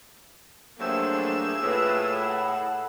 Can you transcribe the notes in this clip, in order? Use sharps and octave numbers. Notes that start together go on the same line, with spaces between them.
G2 F#3 A3 A#3 G#4 C5 E6
A2 F4 B4
F#5 B5